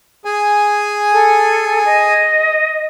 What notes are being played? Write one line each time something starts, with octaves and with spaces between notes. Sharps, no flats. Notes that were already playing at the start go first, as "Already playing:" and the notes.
G#4 G#5
A4
D#5